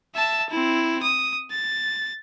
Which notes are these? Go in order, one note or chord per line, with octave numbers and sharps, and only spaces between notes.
E5 A5
C4 E4
D#6
A6